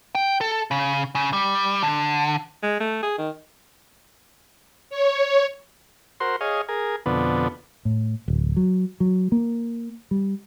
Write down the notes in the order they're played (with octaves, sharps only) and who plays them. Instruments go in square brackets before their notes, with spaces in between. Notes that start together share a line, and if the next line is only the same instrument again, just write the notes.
[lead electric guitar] G5
A4
C#3
C#3
G3
D3
[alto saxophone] G#3
A3
G#4
D#3
[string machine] C#5
[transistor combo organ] F#4 A#4 C5 C6
G#4 C#5 D#5 F5
G#4 A#4
F2 B2 D3 B3
[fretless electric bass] A2
D1
F#3
F#3
A#3
G3